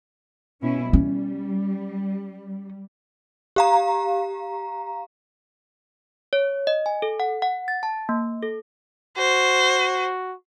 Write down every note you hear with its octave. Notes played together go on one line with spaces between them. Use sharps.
B2 C#4 E4
G3 C#4
G4 F5 A#5
C#5
D#5
G#5
A4
F#5
F#5
A6
A5
A#3
A4
F#4 C5